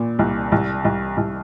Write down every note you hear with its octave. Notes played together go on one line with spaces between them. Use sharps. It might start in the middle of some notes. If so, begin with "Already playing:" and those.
Already playing: A#2
C2
C2
C2
C2